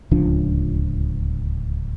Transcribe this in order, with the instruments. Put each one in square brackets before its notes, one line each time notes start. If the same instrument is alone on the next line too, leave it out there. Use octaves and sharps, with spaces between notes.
[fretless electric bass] D1 C#2 F3 D4